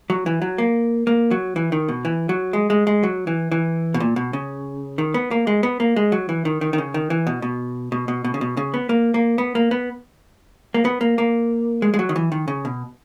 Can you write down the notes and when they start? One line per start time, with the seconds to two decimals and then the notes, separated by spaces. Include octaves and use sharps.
0.10 F#3
0.26 E3
0.42 F#3
0.58 A#3
1.07 A#3
1.31 F#3
1.56 E3
1.72 D#3
1.88 B2
2.05 E3
2.29 F#3
2.53 G#3
2.70 G#3
2.87 G#3
3.03 F#3
3.27 E3
3.52 E3
3.94 B2
4.00 A#2
4.16 B2
4.33 C#3
4.98 D#3
5.14 B3
5.31 A#3
5.47 G#3
5.63 B3
5.80 A#3
5.96 G#3
6.12 F#3
6.29 E3
6.45 D#3
6.61 D#3
6.73 D#3
6.78 C#3
6.94 D#3
7.10 E3
7.27 B2
7.42 B2
7.92 B2
8.08 B2
8.24 B2
8.34 C#3
8.41 B2
8.57 C#3
8.74 B3
8.89 A#3
9.14 A#3
9.38 B3
9.55 A#3
9.71 B3
10.74 A#3
10.85 B3
11.01 A#3
11.18 A#3
11.82 G#3
11.94 G#3
11.99 F#3
12.09 D#3
12.16 E3
12.32 D#3
12.48 C#3
12.65 B2